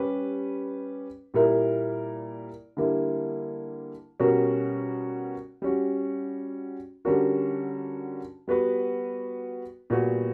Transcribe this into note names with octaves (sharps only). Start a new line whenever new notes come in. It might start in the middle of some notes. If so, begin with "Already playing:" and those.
Already playing: G3 C#4 G4 B4
A#2 G3 A#3 E4 A#4
D3 G3 A#3 E4
B2 G3 C#4 F#4 A#4
G3 C#4 F#4
D3 G3 C#4 F#4 A#4
G3 B3 F#4 B4
A#2 G3 B3 F#4